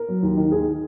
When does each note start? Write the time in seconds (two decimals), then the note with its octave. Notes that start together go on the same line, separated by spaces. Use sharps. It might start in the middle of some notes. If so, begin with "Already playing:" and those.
Already playing: A#4
0.08 F#3
0.23 D#2
0.37 D#3
0.51 D#2 G#4